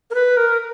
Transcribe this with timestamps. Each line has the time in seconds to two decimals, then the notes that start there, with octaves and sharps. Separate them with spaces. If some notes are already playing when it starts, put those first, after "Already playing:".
0.11 A#4
0.14 B4
0.37 A#4